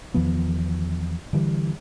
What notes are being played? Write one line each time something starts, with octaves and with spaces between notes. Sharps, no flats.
E2 D#3 F3 B3
D3 E3 G3